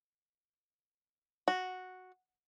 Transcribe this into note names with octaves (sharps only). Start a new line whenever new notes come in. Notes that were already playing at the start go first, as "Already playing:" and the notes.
F#4